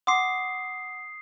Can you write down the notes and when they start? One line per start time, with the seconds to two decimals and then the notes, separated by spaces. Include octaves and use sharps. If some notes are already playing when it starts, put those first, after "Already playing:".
0.07 F#5 C6 D6 D#6 C7